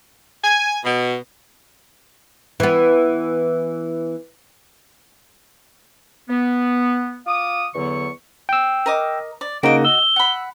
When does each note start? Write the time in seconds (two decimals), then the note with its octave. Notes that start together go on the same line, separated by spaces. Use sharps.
0.44 G#5
0.84 B2
2.60 E3 B3
6.30 B3
7.27 F4 F5 D6 D#6
7.75 E2 D3 F#3 B3 C#6
8.49 G5 E6
8.86 A#4 D#5 D6
9.41 D5
9.63 C#3 A#3 D#4 F#4 D#5 D7
9.85 E6 G7
10.16 F#5 B5